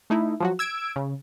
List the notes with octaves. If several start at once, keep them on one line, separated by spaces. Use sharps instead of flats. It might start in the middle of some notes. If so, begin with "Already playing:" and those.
A3 D#4 E4
F3 F#3 F#4
E6 G#6 D7
C#3